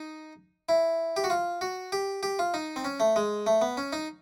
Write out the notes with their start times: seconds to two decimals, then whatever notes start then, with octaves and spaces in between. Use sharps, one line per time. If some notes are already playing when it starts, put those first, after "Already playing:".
Already playing: D#4
0.69 E4
1.17 G4
1.24 F#4
1.30 F4
1.61 F#4
1.92 G4
2.23 G4
2.39 F4
2.54 D#4
2.76 C4
2.84 C#4
3.00 A3
3.16 G#3
3.46 A3
3.62 B3
3.77 C#4
3.93 D#4